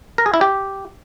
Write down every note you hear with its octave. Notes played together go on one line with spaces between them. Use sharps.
A#4
G#4
E4
G4